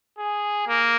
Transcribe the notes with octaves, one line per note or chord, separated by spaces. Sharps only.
G#4
A#3